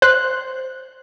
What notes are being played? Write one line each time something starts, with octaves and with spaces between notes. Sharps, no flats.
C5 F#6